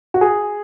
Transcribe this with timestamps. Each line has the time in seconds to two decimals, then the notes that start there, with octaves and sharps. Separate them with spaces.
0.14 F#4
0.21 G#4